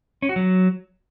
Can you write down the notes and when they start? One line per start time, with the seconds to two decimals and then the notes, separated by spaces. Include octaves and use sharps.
0.22 C#4
0.29 F#4
0.36 F#3